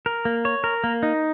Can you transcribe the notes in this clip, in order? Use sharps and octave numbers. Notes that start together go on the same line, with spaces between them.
A#4
A#3
C#5
A#4
A#3
D#4